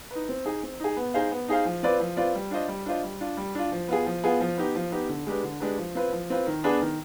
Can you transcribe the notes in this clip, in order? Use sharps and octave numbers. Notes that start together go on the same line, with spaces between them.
D#4 B4
C4
D#4 G#4
C4
D#4 G#4
B3
D#4 G#4 C5 F5
B3
D#4 G#4 C5 F5
F3
C4 F4 B4 D5
F3
C4 F4 B4 D5
G3
D4 F4 C5 D#5
G3
D4 F4 C5 D#5
G3
D4 F4
G3
D4 F4
F3
B3 F4 G#4
F3
B3 F4 G#4
F3
B3 D#4 G4
F3
B3 D#4 G4
D3
G#3 D4 G4 B4
D3
G#3 D4 G4 B4
F3
C4 F4 B4
F3
C4 F4 B4
D#3
B3 D4 G#4 B4
D#3